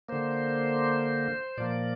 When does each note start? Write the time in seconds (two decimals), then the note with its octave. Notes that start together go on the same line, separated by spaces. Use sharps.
0.08 D3 A#3 C5
1.57 A#2 F3 A#3 D5